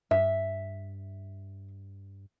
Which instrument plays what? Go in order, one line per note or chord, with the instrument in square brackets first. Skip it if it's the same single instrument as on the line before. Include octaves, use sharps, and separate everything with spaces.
[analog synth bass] G2 [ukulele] E5